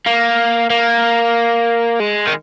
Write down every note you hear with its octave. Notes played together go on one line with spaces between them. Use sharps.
A#3
A#3
G#3
D#3